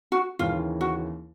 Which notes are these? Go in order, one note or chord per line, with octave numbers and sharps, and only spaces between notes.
F#4
D#2 C#3 E3 F4
F#4